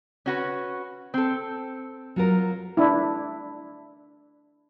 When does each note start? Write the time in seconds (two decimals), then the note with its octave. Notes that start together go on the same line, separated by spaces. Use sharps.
0.26 C#4 F#4 B4
1.14 C4 A4
2.16 F#3 F4 A#4
2.77 D4 E4